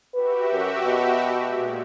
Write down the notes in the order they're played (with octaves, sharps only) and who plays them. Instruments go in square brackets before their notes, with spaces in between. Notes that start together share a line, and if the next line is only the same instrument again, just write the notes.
[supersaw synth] F#4 G4 E5 [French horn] B4
[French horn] F#2
B2
[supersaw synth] A#2 G#3